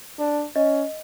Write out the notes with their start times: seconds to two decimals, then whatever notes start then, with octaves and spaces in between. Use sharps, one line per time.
0.19 D4
0.56 C#4 D#5